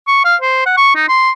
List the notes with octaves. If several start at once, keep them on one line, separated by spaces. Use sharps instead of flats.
C#6
F5
C5
F#5
C#6
D#4
C6